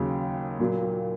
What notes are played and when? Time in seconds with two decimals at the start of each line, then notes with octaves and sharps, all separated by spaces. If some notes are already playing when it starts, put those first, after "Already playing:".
Already playing: D#2 C#3 F#3
0.59 A#2 F#3 A#3